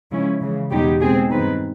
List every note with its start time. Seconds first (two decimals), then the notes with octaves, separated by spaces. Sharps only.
0.11 C#3 F3 G#3 C#4 E4
0.42 C#3 E3 G#3
0.71 E2 B2 G#3 B3 D#4 G4
1.00 B2 G#3 C4 G#4
1.30 G2 D#3 G#3 C4 D#4 B4